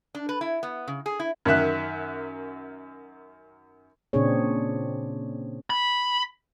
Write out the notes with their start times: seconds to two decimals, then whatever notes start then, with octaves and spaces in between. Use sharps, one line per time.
0.15 D4
0.29 B4
0.41 E4
0.63 B3
0.88 C#3
1.06 G#4
1.20 E4
1.45 F#2 D#3 E5 F#6
4.13 A#2 C#3 C4 D4 G#4 C#5
5.70 B5